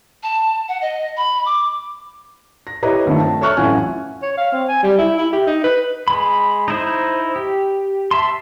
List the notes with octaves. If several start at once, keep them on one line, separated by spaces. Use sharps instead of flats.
A5
F#5
D#5
B5
D6
A#6
E4 G4 B4 C#5 D#5 A#5
G2 D#3 F3 A3
A5
A4 C#5 E5 C#6 F6 F#6
A1 F#2 E4 F4 F#5 G#5
C#5
F5
C4
G#5
G3
E4
E4
G4
D#4
B4
G#3 B5
D#4 E4 C5
G4
E5 A5 C6